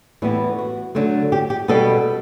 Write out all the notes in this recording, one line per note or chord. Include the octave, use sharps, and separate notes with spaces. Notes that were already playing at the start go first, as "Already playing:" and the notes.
A2 E3 G3 B3 E4
F#4
D3 F#3 A3
G4
G4
B2 G3 B3 A4